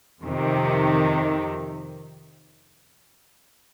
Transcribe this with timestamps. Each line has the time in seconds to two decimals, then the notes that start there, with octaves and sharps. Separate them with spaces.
0.22 F2 C3 D#3